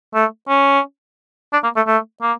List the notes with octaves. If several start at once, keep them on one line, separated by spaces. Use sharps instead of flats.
A3
C#4
D4
A#3
A3
A3
A#3